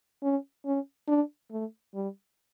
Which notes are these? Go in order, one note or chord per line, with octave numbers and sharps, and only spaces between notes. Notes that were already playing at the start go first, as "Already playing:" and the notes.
C#4
C#4
D4
A3
G3